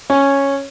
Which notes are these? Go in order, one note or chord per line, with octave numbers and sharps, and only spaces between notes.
C#4